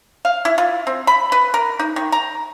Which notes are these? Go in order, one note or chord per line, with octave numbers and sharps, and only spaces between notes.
F5
E4
F4
C4
B5
B4
A#4
D#4
D#3
A#5